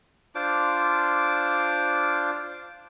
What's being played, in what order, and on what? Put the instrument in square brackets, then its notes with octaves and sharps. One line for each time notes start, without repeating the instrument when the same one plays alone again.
[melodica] D4 F4 C5 D6